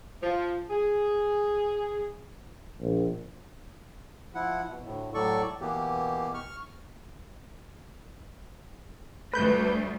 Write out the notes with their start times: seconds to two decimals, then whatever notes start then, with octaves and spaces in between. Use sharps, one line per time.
0.23 F3
0.70 G#4
2.80 A#1
4.35 F3 E4 F#5
4.69 B2
4.84 D2 A2
5.14 A2 F#3 A4 D5 C#6
5.61 B2 E3 A#3 B3 G4
6.34 C#6 F6
9.33 D2 G3 A3 B4 G6